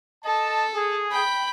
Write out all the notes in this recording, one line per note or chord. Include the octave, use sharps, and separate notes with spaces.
A4 D#5 A5
G#4
G5 B5